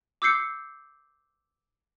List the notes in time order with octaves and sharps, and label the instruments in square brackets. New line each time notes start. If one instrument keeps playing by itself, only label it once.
[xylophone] D6 E6 G6 C7 C#7